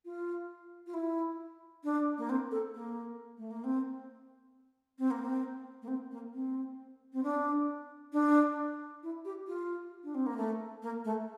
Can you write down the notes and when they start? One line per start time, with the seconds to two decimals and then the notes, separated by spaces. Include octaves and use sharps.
0.05 F4
0.86 F4
0.94 E4
1.84 D4
2.18 A#3
2.29 C4
2.51 A4
2.74 A#3
3.37 A3
3.51 A#3
3.64 C4
4.99 C4
5.11 A#3
5.22 C4
5.82 A#3
5.88 C4
6.11 A#3
6.34 C4
7.13 C4
7.23 D4
8.13 D4
9.03 E4
9.25 G4
9.47 F4
10.04 D4
10.14 C4
10.26 A#3
10.37 A3
10.82 A#3
11.04 A3